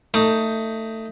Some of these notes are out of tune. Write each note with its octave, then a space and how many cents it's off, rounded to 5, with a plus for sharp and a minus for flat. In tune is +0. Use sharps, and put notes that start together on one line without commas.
A3 +20 D#4 +10